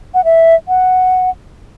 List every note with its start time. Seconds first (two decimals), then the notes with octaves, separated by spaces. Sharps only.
0.14 F#5
0.24 E5
0.68 F#5